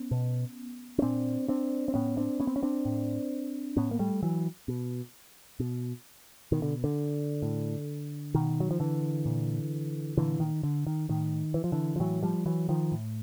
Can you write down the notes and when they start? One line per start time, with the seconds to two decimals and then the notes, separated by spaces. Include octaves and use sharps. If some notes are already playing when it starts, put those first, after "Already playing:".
Already playing: B3 C#4
0.11 B2
0.98 C#4
1.02 A#2 C4 D4
1.48 C4 D4
1.88 C4
1.94 A2 B3 C#4
2.17 C4 D4
2.40 B3 C#4
2.47 C4
2.56 C#4
2.63 C4 D4
2.85 A2
3.77 A2 B3 C#4
3.91 A#3
3.99 G3 A3
4.23 E3 F#3
4.68 B2
5.60 B2
6.52 B2 D#3
6.62 D3
6.84 D3
7.42 A2
8.35 B2 D#3
8.60 F#3
8.71 F3
8.80 D3 E3
9.26 A#2
10.17 A#2 D3 E3
10.40 D#3
10.63 D3
10.87 D#3
11.09 A2 D#3
11.54 E3
11.64 F3
11.72 D3 E3
11.96 F3
12.00 A2 E3 F#3
12.23 F3 G3
12.46 E3 F#3
12.69 D#3 F3
12.92 A2